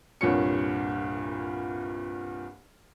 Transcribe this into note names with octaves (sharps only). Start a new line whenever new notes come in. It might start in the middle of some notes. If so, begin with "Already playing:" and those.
C2 G2 A#2 C#5 C#7